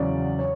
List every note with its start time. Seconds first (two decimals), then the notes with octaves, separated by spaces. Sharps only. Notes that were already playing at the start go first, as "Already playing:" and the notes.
Already playing: E2 C#3 F#3 D5
0.39 C#5